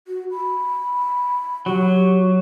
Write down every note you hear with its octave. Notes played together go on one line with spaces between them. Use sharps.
F#4
B5
F#3 G4